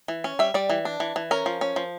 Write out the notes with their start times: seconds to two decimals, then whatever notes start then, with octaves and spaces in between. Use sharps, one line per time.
0.08 E3
0.24 C#4
0.39 G3 E5
0.54 G3 D5
0.70 E3
0.85 D4
1.00 E3
1.16 E3
1.31 C#4 A#4
1.46 F3
1.61 C#4
1.76 F3